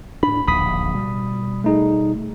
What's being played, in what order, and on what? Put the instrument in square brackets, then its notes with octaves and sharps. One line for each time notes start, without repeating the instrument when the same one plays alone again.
[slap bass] A2 D4 [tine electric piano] B5
[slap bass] D1 A#1 D#2 [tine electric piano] B5 D#6 B6
[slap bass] B2 G3
[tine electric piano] A3 D#4 G#4